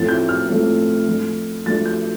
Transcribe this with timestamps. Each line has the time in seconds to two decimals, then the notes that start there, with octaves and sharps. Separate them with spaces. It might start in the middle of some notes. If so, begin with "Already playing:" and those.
Already playing: A2 F3 A3 C4 A6
0.09 G6
0.29 F6
0.48 A2 F3 A3 C4
1.07 F3 A3 D4
1.66 F3 A3 D4 A6
1.86 G6